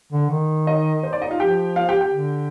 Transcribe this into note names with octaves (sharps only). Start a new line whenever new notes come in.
D3
D#3
D#4 D#5
C5
D5
D#4 D#5
F4 F5
F3 G4 G5
F4 F5
G4 G5
G4 G5
D3